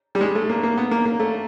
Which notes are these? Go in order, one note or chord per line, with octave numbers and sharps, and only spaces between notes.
G3
G#3
A3
A#3
A#3
B3
A#3
A#3
A3